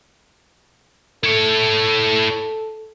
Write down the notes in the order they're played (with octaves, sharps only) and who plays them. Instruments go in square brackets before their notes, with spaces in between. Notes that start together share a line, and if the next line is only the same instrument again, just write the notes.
[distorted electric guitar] E4 C#5 [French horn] A4